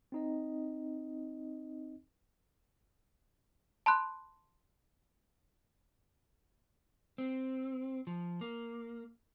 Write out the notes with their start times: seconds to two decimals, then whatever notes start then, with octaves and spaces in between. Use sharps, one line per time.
0.12 C4 D#4 D#5
3.86 A5 B5 C6 F#6
7.18 C4
8.07 F3
8.41 A#3